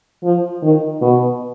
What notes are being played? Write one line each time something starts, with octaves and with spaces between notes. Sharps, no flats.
F3
D#3
B2